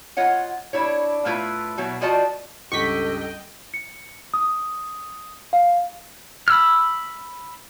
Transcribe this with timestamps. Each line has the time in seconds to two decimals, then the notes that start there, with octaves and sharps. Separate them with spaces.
0.17 F4 C#5 D#5 F#5
0.73 D4 E4 C#5
1.25 A2 A3 E4 F4 B4
1.78 B2 F#3 E4
2.01 F3 F4 F#4 D5 D#5 A5
2.72 C#2 G2 G4 A4 D#5 G5 C#6 B6
3.74 C#7
4.34 D#6
5.53 F5
6.48 B5 E6 F6